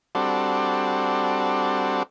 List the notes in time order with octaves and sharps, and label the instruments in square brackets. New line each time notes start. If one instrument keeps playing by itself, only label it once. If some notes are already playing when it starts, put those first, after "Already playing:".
[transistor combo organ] G3 C4 D4 F#4 A4